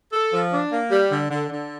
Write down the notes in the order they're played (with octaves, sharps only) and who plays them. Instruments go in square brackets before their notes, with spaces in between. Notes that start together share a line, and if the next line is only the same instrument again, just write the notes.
[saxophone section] A4
F3
D4
A#3
G3
D3
D3
D3